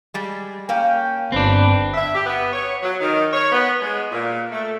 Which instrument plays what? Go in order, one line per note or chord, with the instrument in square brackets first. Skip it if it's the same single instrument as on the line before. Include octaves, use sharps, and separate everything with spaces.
[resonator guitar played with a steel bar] G3 G#3
[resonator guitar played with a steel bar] A#3 C#4 F5 [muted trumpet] G5
[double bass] G1 [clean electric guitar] C4 D4 [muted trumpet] B4
[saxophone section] E5
G4
B3
C#5
F#3
D#3
C#5
B3
G#3
A#2
A3